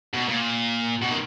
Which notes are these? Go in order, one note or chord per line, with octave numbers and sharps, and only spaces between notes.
B2
A#2
B2
D#3